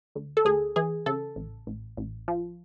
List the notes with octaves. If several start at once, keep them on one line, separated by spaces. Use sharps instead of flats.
D2
A4
D2 G#4
E3 G#4
C#3 A4
A1
A1
A1
F3